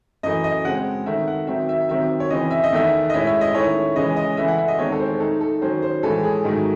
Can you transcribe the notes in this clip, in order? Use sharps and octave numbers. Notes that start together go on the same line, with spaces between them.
F#2 E3 A3 D#5
D#5
C#3 G#3 C4 F#5
D#3 A3 C4 E5
F#5
D#3 F#3 C4 D#4 E5
E5
C3 D#3 F#3 C4 E5
C#5
C#3 E3 C4 D#5
E5
D#5
E2 D#3 A3 E5
D#5
A2 G#3 C#4 E4 E5
E5
D#5
D#3 A3 C#4 E4 C#5
C#3 E3 G#3 C#4 D#5
D#5
C#3 E3 A3 E5
F#5
E5
D#5
E2 D#3 G#3 C4 C#5
A4
C5
D#3 A3 D#4 A4
A4
D#3 F#3 C#4 C5
C5
A2 E3 G#3 C#4 A4
G#4
G#2 D#3 F#3 A3